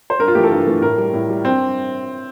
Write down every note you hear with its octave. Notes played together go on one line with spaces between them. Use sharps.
C5
G2 A#4
F4
E3 A3 G4
A4
G2 A#4
E3 A3
A2 A#4
G3
A2
G3
G2 C4